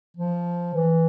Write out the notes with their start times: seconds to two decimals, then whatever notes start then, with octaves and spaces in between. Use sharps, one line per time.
0.17 F3
0.74 E3